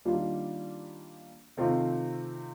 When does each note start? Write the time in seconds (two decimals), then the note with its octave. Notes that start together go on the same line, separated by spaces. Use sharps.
0.05 D#3 G3 A#3 D4 F4
1.57 C3 D#3 A3 C4 F4